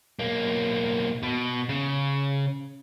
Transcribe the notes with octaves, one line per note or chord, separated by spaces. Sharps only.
B1 A#3
B2
C#3